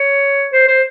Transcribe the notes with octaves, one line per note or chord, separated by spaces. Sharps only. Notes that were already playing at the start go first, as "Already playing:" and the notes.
Already playing: C#5
C5
C5